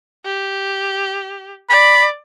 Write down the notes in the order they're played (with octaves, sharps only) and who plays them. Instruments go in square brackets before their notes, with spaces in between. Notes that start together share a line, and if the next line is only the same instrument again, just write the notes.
[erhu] G4
[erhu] D5 [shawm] B5